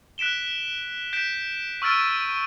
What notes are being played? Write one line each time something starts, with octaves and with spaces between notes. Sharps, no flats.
F#6 B6 D7 E7 G7
G6 B6 D7 E7
C#6 E6 F6 A6 D7 D#7